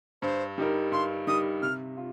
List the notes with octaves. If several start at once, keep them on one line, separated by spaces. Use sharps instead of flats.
G2 C5
G3 D#4 A#4
G2 C6
G3 D#4 A#4 D#6
C3 F6
F4